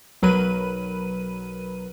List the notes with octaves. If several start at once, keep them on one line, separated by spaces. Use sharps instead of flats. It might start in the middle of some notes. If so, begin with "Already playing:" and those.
B1 F#3 A#4 B4 B5 D#7